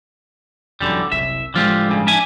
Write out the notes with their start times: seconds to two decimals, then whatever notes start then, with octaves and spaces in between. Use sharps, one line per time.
0.80 E1 F#2 D3 G3
1.12 F#1 C2 E5
1.54 A1 D3 F3 G#3 F4 G4
1.89 G2 C#3
2.07 D4 E5 G#5